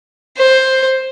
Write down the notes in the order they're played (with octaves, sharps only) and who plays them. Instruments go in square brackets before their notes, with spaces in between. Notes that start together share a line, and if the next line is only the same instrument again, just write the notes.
[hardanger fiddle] C5